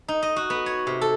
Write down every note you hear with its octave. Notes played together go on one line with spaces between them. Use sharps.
D#4
D#5
F#4
B3
C#5
C3
A4